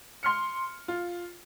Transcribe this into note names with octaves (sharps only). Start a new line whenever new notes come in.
C6 F6 C#7
F4